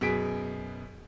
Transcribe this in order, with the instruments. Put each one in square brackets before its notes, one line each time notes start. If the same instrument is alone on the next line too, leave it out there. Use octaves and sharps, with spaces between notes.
[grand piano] F#2 B2 G#4 B6 D7